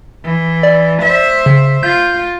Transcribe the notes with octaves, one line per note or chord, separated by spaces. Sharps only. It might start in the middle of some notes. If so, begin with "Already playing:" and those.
E3
D5
C5 E5
C#3
F4 G6